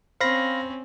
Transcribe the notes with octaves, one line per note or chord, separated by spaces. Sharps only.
C4 C#4 C5 F5 B5 A#6